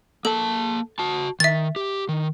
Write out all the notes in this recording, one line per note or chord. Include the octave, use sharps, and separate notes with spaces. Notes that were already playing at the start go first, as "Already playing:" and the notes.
A#3 A4 A5
F#4 A5
D#3 E5 A6
G4
D#3